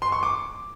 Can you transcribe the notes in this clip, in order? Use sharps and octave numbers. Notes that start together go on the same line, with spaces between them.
C6
C#6
D6